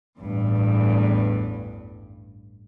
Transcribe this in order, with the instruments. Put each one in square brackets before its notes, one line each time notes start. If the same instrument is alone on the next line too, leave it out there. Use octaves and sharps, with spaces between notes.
[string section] A1 E2 G2